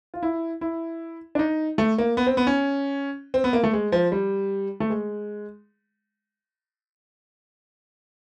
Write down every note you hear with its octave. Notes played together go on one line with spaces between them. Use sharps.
F4
E4
E4
D4
D#4
A3
A#3
B3
C4
B3
C#4
C4
B3
A#3
A3
G#3
F3
G3
A3
G#3